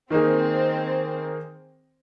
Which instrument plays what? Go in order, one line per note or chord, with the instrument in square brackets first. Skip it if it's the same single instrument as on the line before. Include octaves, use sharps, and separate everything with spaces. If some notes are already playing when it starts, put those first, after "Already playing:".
[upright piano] D#3 A#3 D#4 G#4 [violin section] C4